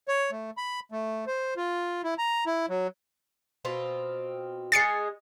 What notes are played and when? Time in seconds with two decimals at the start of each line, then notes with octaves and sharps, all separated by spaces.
0.08 C#5
0.31 A3
0.57 B5
0.92 A3
1.27 C5
1.57 F4
2.04 E4
2.18 A#5
2.46 E4
2.69 F#3
3.65 B2 C4 F4
4.72 G#3 G#4 A6 C7 C#7